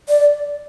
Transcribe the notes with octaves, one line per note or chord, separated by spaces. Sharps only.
D5